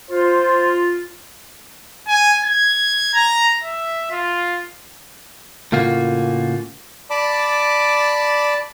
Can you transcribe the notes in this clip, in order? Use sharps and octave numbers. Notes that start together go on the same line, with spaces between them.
F4 C5
G#5
G#6
A#5
E5
F4
A2 C#3 A#3 F4 F#4
D5 A5 B5 D6